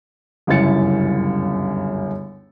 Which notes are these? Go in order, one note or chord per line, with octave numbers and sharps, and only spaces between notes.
G1 C#2 F#2 E4 A6 C#7